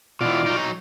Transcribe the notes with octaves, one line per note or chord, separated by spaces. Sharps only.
B2 E3 F4 D5
F#3 D#4